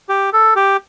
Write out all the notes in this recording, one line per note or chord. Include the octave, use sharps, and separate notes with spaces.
G4
A4
G4